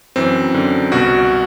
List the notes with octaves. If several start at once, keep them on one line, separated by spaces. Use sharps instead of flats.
F#2 E3 C4
F#2 D3
C2 B2 F#4